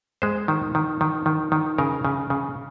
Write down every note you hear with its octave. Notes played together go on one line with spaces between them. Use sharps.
G#3 C5
D#3
D#3
D#3
D#3
D#3
C#3 A#4
C#3
C#3